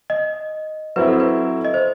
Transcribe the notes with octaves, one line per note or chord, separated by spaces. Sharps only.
D#5
F#3 C4 E4 B4
A4
B4
D#5
C5